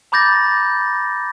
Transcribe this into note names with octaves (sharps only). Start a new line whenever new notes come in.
A#5 B5 D6 G6 A6 A#6